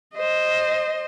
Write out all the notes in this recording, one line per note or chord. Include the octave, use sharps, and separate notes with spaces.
C5 D#5